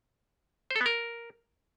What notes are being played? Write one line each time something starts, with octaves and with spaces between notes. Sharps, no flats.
C5
A4
B3
A#4